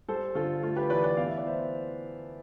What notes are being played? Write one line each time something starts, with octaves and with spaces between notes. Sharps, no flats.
G3 A4 C5
D3 F4 A4
A3 F4 A4
G4 B4
E3 B4 D5
B4 D5
B3 F5
E5
D5
E3 C5 E5